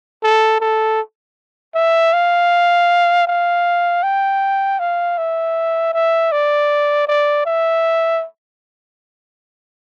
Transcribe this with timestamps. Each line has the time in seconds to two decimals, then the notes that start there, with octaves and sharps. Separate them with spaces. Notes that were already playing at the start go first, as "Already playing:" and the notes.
0.23 A4
0.61 A4
1.75 E5
2.13 F5
3.27 F5
4.03 G5
4.80 F5
5.18 E5
5.94 E5
6.32 D5
7.08 D5
7.46 E5